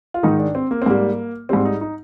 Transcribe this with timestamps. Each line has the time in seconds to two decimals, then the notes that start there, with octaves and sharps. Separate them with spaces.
0.14 F4
0.23 G#2 D#3 G#3 D#4
0.39 D4
0.55 C4
0.71 A#3
0.82 C4
0.86 G#2 G3 A#3
1.49 G#2 G3 C4
1.65 D#4
1.81 D#4